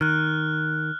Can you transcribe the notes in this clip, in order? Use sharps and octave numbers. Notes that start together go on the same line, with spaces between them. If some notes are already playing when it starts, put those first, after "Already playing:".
D#3 F6 F#6